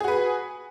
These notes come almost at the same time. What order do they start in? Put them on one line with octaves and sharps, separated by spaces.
G#4 F#4 B4